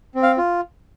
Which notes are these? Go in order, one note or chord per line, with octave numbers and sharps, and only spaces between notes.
C4
F5
F4